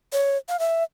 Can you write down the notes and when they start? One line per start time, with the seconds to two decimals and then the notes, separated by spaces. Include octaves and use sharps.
0.13 C#5
0.49 F5
0.59 E5